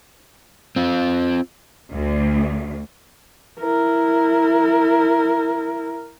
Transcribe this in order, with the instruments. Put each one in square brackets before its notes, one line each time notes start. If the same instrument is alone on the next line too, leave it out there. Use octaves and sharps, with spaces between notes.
[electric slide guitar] C4 F4
[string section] D2
[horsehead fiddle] E4 A#4